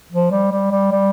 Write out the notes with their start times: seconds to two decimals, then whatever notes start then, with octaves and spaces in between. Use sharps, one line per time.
0.12 F3
0.31 G3
0.52 G3
0.72 G3
0.92 G3